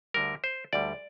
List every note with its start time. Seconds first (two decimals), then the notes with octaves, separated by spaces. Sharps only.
0.14 D2 D3 G3 A#4
0.44 C5
0.73 D2 D3 G3 D5